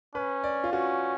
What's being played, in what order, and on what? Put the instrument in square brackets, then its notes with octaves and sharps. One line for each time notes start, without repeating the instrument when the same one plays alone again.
[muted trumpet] C#4 [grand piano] B4
[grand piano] D5
F4
[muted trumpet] C#4 [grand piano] F#4